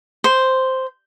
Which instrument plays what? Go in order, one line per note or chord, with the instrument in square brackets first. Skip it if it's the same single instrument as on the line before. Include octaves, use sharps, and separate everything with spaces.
[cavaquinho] C5